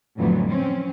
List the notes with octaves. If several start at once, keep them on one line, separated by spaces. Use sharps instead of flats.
F2 A2 D3 E3 F#3 B3
C4 C#4